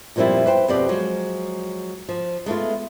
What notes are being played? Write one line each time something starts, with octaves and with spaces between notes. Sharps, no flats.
F2 A#2 F3 G3 C4 E4
B4 C5 G5
F2 B2 C4 G4 B4 D5
F3 F#3 G#3
F3
G#3 A3 B3 F4